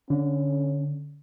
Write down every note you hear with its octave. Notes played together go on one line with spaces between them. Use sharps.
D3 C#4